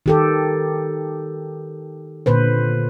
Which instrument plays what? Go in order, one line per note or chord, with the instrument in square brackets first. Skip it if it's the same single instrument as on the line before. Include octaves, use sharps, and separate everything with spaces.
[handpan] D#3 G4 A4
A#2 D3 B4 C5